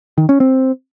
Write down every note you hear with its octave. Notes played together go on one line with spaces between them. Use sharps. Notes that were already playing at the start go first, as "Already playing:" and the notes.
D#3
C#4
C4